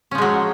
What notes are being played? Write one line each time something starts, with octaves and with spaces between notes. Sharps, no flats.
F3 F#3 G#3 C#4